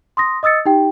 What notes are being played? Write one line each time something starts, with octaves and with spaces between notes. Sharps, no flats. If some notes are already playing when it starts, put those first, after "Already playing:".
C6 D#6 A#6
D#5 D#6 E6 A6 C#7
D#4 G4 G5